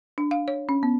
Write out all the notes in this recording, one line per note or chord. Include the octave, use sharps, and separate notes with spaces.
D4
F5
C#5
C#4
B3